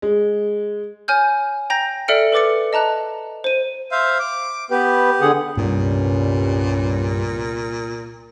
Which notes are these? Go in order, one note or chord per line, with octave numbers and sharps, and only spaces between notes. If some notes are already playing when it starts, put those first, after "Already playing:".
G#3
C#5 G#5 F6 G6
G5 A#5 G6 A#6
A4 D5 E5 F6 C#7 D7
A4 B4 D6 A6 C#7
D#5 A5 A#5 F#6
C5 D#7
C5 E5 F5
D6
B3 G4 B4
D3 G#4 F#5
C2 G2 A#2 G3 B3 C#4